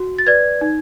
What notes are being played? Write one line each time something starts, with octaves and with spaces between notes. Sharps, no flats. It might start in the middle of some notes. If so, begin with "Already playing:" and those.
Already playing: F#4
A6
B4 D5 G#6
D#4